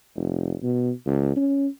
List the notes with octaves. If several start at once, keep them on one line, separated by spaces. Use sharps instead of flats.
F1
B2
C#2
C#4